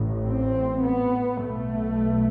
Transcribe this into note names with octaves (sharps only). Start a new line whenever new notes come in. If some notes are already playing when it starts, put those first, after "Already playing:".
Already playing: A1 A2
C4
B3
B1 B2 A3